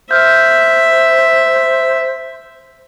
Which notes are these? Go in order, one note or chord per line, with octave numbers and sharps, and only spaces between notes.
C5 E5 F6 G6